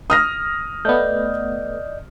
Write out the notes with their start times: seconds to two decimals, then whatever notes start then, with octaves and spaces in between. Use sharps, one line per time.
0.10 D#6 F6 A#6
0.85 A3 B3 D5 D#5 G6